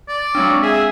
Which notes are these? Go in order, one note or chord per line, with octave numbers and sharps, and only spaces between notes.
D5
F#3 G#3 C4 D4
G#4 E5